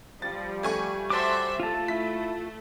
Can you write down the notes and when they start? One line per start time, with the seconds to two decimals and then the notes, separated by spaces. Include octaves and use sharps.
0.22 F3 G3 A6
0.63 A3 G#5 C#6
1.10 F#4 C5 E5 A5 D6
1.60 A3 F4 A5
1.88 E4 B6